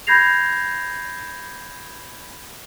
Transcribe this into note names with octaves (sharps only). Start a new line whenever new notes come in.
B5 G6 G#6 A#6 C7 F7